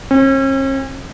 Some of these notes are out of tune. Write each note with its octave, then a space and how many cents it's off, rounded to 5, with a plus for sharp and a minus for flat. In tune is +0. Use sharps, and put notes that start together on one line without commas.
C#4 -45